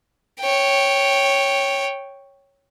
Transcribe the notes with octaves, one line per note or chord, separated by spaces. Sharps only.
C#5 G5